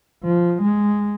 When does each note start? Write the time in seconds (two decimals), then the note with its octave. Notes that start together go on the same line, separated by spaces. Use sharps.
0.23 F3
0.62 G#3